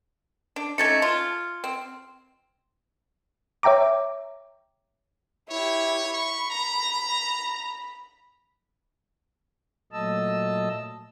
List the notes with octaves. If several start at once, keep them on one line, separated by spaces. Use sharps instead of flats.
D4
A3 C#4 D#4 G#6 A6 C#7
F4
C4
C#5 E5 G5 A#5 D6
E4 G4 C#5
B5 C#6
A#5
A#2 F#3 A3 D#5 A5 E6